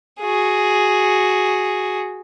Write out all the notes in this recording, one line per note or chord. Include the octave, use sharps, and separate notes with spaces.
F#4 G#4